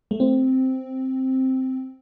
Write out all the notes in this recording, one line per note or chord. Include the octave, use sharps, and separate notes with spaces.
A3
C4